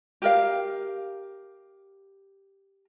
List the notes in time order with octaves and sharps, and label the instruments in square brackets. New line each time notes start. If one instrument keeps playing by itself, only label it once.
[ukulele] G4 A#4 F5